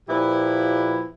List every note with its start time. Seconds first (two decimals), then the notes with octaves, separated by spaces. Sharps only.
0.09 A#2 F3 E4 G4 B4